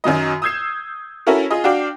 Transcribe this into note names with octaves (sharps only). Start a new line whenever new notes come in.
F#2 D#3 F#3 D#5
D#6 E6 G6 G#6 C7 E7
C#4 E4 F#4 A4 A#4
F4 G#4 D#5
D4 F#4 F5 G5 D6